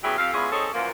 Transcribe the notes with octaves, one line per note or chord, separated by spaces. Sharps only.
F#3 B3 C#4 E4 G4 G#4
F2 G4 A4 F5
G#3 B3 C#4 E4 F4 G#4
C4 C#4 D#4 G#4 A4 C#5
F#2 A#2 E3 F3 A#3